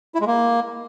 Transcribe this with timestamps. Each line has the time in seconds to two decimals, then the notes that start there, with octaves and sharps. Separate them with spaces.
0.15 E4
0.21 G#3
0.26 A#3